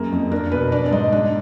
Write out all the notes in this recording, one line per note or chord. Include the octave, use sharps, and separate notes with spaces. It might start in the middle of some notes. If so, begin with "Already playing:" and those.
Already playing: F#2 A#3 G#4
F2
D4 A#4
B2 B4
D4 D5
D5
G#2 D#5
D4 D5